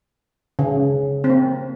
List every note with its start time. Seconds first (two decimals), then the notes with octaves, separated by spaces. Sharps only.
0.59 C#3
1.24 C4
1.29 A#3